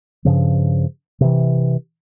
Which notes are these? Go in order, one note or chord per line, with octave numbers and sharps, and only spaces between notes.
G2 C#3 F3
C3 E3